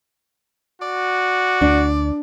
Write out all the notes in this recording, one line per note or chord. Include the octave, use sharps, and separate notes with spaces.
F#4 D5
D2 D4